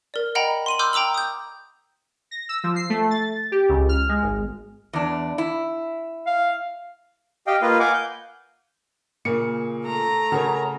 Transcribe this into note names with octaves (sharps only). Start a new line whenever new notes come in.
A#4 D5
D#5 F#5 G5 A#5 B5
C6 D#7 F#7
B5 C6 D6 E6 F6 G6
G5 A#5 D6 E6 F#7
D#6 G6
A#6
E6
F3
C7
A3
A6
G4
C#2
F6
G#3
G#1
E2 D4
E4
F5
G4 D#5 F5 G5
A#3 F4 B4 D#5 F5
F5 F#5 G#5 D6
G6
A#2 C#3 A#3 C#7
A3 A#5
C#3 F#4 A#4 C#5